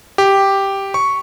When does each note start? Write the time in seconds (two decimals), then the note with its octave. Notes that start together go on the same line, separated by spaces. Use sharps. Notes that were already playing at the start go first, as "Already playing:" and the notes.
0.18 G4
0.94 C#6